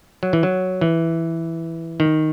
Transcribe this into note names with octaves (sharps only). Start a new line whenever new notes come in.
F#3
E3
F#3
E3
D#3